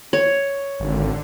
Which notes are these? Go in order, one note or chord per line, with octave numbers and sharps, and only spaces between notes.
C#5
G#1 D3